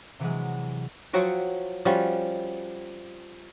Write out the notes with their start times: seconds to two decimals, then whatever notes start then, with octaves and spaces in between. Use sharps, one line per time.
0.20 C3 E3 F#3 G#3
1.13 F3 F#3 F#4 G5
1.85 F3 G3 C#4 F#4